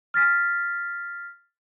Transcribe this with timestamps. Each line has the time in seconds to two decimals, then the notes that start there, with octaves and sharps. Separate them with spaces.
0.14 F6 A6 B6